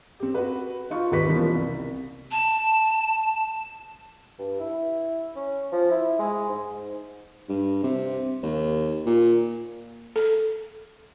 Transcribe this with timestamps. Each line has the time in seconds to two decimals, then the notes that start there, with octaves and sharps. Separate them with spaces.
0.20 C4 G4
0.34 F#4 B4
0.90 D#4 F4 C#6
1.11 G#1 D#2 G4 B4 C#6 B6
1.28 B2 E3 F3 G3 A#3 C#4
1.55 C2
2.31 A5
4.39 G2
4.60 E4
5.36 C#4
5.72 F3
5.91 E4
6.19 G#3
6.49 G#2
7.49 G2
7.83 C3
8.43 D#2
9.06 A#2
10.16 A4